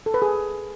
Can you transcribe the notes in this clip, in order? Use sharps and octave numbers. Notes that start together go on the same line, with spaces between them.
A4
B4
G#4